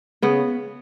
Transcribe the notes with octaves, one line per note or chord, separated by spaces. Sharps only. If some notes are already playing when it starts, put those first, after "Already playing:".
C#3 B3